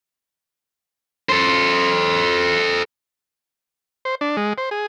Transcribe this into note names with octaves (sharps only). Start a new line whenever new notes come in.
A4 C5
C5
D4
G#3
C5
G#4